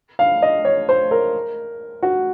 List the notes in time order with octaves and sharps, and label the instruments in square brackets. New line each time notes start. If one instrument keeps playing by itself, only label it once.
[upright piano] F5
D#5
C#5
C5
A#4
F#4